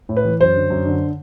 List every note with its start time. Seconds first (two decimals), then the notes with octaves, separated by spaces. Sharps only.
0.09 A2
0.17 B4
0.25 E3
0.40 F#2 C5
0.56 D3
0.70 F#2
0.86 D3